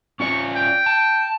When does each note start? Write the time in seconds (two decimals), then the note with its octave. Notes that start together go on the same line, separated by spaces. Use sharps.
0.20 C#4 F4 D5 C#6
0.56 G5
0.86 A5